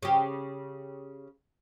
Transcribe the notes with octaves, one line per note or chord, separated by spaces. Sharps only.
C#3 G4